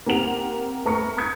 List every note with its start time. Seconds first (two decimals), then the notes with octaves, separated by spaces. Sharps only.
0.06 A#3 C4 G4 A#4 F#5 F7
0.85 A3 B4 A#5 C#6 F6 C#7
1.17 B5 D#6 G6 G#6 C#7